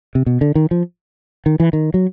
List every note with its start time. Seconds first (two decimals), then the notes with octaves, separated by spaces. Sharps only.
0.15 C3
0.26 B2
0.41 D3
0.55 D#3
0.71 F3
1.46 D#3
1.60 E3
1.73 D#3
1.94 F#3